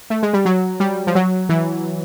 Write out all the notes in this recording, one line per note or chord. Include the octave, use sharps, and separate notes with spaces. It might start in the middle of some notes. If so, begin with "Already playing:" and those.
A3
G#3
G3
F#3
G3
F3
F#3
E3